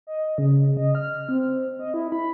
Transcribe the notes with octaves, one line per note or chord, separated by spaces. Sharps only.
D#5
C#3
D#5
F6
C4
D#5
E4
B5